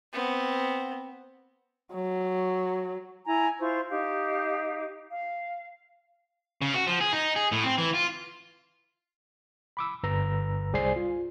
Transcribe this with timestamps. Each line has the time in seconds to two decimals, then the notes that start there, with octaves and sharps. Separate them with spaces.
0.13 B3 C4
1.94 F#3
3.26 E4 G#5 A#5
3.60 E4 F4 C5 C#6
3.90 D#4 G4 F5
5.11 F5
6.62 C#3
6.74 F#4
6.87 F3
7.01 G#4
7.13 D#4
7.36 G#4
7.52 A2
7.64 C4
7.78 E3
7.94 F4
9.77 B5 D6 E6
10.03 G1 G2 B4 A#5 E6
10.73 C2 G#4 C5 D5 G#5 C7
10.96 F4